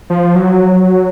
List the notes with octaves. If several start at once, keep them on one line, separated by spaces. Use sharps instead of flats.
F3
F#3